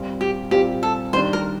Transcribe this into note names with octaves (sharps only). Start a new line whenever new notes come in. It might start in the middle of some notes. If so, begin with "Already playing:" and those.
Already playing: A#2 G3 C4 F4
G4
A#2 G3 C4 F4 G4
A4
D#3 G3 D4 C5
A#4